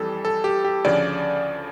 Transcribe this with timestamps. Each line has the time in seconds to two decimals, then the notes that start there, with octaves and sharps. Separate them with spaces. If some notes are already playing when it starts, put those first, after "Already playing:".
Already playing: F2 E3 G3 A4
0.25 A4
0.44 G4
0.64 G4
0.84 D2 C#3 F3 D5